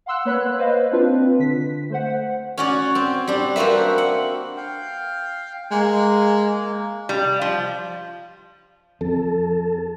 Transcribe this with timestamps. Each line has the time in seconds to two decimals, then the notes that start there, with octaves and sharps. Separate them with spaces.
0.06 F5 F#5 C6 E6 F#6
0.25 A#3 B4 C#5 B5 F#6
0.59 B4 C5 D#5 F5
0.92 C4 D4 F4 B4
1.39 D3 B6
1.90 A3 C5 F#5
2.57 C#4 F#4 D5
2.95 C4
3.27 G3 D4
3.56 A#3 C4 F#4 B4 E5
3.98 F#5
4.57 F5 G5
5.71 G#3 A#3
7.09 G3
7.42 F3
9.01 F2 A4